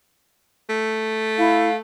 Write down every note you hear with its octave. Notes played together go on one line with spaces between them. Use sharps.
A3
E4 F5